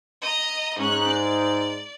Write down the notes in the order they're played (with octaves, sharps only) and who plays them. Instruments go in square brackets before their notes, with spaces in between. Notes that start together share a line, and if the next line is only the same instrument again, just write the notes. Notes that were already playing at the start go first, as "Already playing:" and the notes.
[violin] D#5 A#5
[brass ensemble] G#2 D#4 [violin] C#4 F#6
[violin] D5